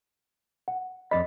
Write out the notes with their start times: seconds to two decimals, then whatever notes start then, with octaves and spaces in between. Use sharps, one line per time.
0.68 F#5
1.11 F2 D5 D#5 B5